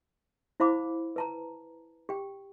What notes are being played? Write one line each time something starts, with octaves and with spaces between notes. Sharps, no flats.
E4 C5 F5 B5 D6
B4 A5 A#5
G4 G5